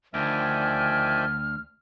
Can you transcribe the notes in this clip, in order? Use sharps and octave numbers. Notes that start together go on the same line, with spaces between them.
D2 D#3 F3 D5 E5 G5 G#5 F6